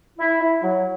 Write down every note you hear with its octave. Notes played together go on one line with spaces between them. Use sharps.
E4
E4
F#3